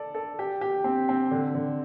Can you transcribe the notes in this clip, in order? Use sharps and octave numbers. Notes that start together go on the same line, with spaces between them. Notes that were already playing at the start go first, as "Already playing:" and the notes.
Already playing: A4 D5
A4
G4
G4
C4
C4
D3
D3